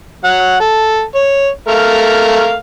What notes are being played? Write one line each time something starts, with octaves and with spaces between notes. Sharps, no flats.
F#3 F#5
A4
C#5
A3 A#4 F5